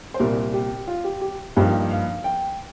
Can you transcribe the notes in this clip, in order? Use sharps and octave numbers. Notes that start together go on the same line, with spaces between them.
C5
C2 A#2 G3 A#4
G4
F4
G4
G4
G2 F3 A#3 D#4 G4
F5
G5